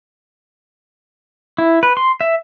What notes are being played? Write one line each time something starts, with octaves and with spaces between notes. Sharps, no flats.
E4
B4
C6
E5